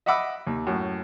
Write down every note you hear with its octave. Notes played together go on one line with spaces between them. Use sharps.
D#5 E5 F#5 B5 D6 E6
D#2
F#2 A2